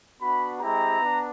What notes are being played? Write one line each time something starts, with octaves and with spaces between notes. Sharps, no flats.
B3 D4 F#4 B5
G#3 C4 E4 G4 A#5
B3 D4